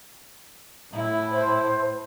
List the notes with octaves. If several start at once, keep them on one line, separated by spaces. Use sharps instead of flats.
A2 E4
C5